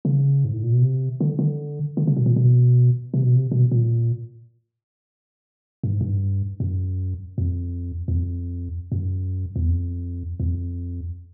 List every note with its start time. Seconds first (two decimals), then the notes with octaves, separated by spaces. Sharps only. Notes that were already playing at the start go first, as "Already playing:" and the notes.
0.05 C#3
0.45 G#2
0.53 A2
0.63 A#2
0.72 B2
0.82 C3
1.21 D3
1.39 D3
1.97 D3
2.07 C#3
2.17 B2
2.26 A#2
2.36 B2
3.14 C3
3.24 B2
3.36 C3
3.52 B2
3.72 A#2
5.84 G2
5.92 G#2
6.01 G2
6.60 F#2
7.38 F2
8.08 E2
8.15 F2
8.92 F#2
9.56 E2
9.69 F2
10.40 E2
10.47 F2